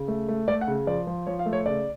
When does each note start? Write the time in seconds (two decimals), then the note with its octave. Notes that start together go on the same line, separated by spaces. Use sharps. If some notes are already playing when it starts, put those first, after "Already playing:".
Already playing: C#3
0.08 A3
0.28 A3
0.48 A3 D5
0.61 F#5
0.67 C#3
0.87 F3 D5
1.07 F3
1.27 F3 C#5
1.39 F5
1.46 A3
1.53 C#5
1.66 C#3 D5